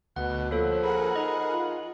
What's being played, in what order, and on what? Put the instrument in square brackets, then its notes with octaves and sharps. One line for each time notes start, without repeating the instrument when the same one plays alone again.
[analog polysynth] D2 [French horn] B2 [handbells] F#5 [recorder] F#6
[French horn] F3 [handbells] A#3 A4 [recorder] C#5
[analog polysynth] G#4 A#4 F#5 [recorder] B5
[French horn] D#4 [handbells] D#5
[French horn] F4